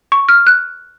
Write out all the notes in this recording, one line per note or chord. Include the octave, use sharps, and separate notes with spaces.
C#6
F6
F#6